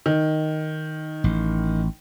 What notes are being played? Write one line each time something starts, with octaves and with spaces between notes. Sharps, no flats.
D#3
A1